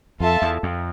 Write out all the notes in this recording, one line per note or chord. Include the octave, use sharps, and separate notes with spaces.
F2 F4 A4 E5 A5
E2
F2